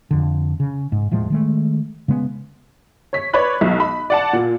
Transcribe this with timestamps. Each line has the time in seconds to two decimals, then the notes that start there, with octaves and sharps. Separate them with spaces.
0.11 F2 D3
0.60 C#3
0.92 G#2
1.11 D#1 A2 F3 G#3
1.30 D#3 G#3 A3
2.08 C#3 G#3 B3
3.13 C#5 B6
3.33 B4 C#5 D5 B5 F#6
3.61 B1
3.80 B5
4.10 D5 F#5 A5
4.33 A#2